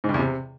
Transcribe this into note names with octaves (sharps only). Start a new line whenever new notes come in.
G#2
G2
E2
C3